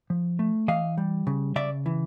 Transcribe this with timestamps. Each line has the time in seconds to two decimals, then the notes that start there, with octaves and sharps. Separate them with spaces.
0.10 F3
0.39 A3
0.68 E3 D#5 F5
0.97 G3
1.27 C#3
1.56 C#3 D5 E5
1.86 E3